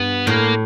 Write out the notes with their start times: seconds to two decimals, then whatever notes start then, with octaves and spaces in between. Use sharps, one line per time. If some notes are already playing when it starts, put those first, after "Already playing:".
Already playing: G2 B3
0.27 A2 A#3